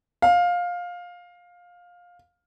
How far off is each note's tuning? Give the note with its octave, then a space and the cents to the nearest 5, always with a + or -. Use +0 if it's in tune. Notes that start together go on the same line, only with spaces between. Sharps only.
F5 +15